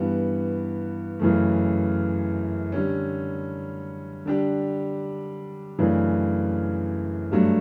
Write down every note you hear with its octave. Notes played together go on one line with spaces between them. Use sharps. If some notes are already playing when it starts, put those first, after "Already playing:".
Already playing: G2 E3 B3
F#2 C#3 E3 A3
D3 G3 C#4
D3 G3 D4 G4
F#2 C#3 E3 A3 D4
G2 F#3 A3 D4